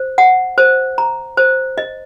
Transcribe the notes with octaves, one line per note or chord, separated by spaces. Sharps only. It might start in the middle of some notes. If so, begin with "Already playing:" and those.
Already playing: C5
F#5
C5
A#5
C5
D#5